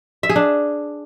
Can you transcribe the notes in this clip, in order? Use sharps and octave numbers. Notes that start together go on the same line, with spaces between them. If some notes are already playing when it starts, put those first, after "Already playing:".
E5
G#4
D4